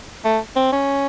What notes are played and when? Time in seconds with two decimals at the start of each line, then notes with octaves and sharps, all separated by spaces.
0.24 A3
0.56 C4
0.72 C#4